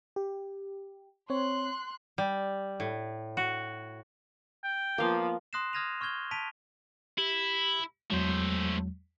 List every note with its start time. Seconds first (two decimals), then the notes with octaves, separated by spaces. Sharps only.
0.16 G4
1.30 C4 C#5 C6 F#6
2.18 G3
2.80 A2
3.37 F#4
4.63 G5
4.98 F3 A#3 B3 F5
5.53 C6 D#6 F#6 A#6 C7 E7
5.73 D#6 F6 G#6 A#6 D#7 F7
6.01 C#6 F6 G6 G#6 G7
6.31 A5 B6 D7 D#7 F7
7.18 E4 G4
8.10 E2 F#3 G#3 A3 C5